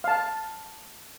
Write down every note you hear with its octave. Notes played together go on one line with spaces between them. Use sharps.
F5 A5